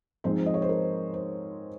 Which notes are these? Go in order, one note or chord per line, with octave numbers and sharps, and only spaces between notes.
G#2 F3 G#3 C4 C5
D#5
C#5
C5
A#4
C5